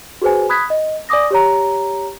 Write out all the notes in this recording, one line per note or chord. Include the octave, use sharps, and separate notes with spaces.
F#4 G#4 B4 C5 G#5
B5 D#6 F#6 G#6 B6
D#5
D5 G#5 D6 D#6 A#6
G4 C#5 A#5